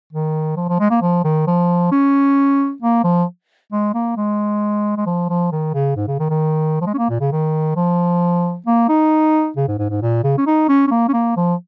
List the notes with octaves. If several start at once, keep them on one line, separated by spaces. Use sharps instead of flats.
D#3
F3
F3
G#3
A#3
F3
D#3
F3
C#4
A#3
F3
G#3
A#3
G#3
G#3
F3
F3
D#3
C#3
G#2
C#3
D#3
D#3
F3
G#3
C#4
A#3
A#2
C#3
D#3
F3
A#3
D#4
C#3
G#2
G#2
G#2
A#2
C#3
C#4
D#4
C#4
C#4
A#3
C#4
A#3
F3